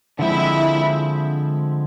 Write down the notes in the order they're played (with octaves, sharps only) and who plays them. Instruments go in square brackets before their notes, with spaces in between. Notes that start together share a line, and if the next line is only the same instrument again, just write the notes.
[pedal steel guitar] D3 F3 G#3 C4 [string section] E4